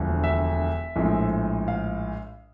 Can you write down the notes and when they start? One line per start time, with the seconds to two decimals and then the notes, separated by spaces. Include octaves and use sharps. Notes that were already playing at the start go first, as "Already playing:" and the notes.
Already playing: E1 D2 D3 F3
0.24 E5
0.96 A#1 A2 F3 G#3
1.68 F5